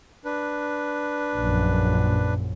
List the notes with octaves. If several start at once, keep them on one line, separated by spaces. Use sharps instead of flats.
D4 B4
A#1 F#2